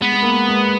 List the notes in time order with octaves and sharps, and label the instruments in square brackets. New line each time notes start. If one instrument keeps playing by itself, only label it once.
[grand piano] G#3 [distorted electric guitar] B3
[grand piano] G#3
A#3
G#3
G#3